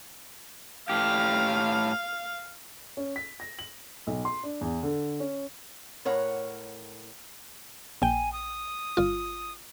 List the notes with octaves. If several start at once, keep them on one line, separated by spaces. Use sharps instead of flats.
A2 G4 F5
C#4
B6
A#6
F#7
B1
C6
D4
E2
D3
C#4
A2 A#4 C#5 F#5
A#1 G5 G#5
D#6
G1 F4